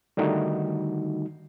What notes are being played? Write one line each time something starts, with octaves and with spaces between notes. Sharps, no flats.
D3 D#3 G3 A3 D#4 F#4